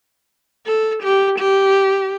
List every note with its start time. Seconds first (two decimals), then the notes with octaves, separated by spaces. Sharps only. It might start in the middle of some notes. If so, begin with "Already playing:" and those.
0.67 A4
1.03 G4
1.39 G4